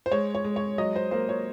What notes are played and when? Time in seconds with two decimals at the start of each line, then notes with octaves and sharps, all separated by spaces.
0.06 C5
0.12 G#3 C#5
0.35 C#5
0.44 G#3
0.56 C#5
0.78 F#3 D#5
0.96 C5
1.11 A#3 C5
1.29 C#5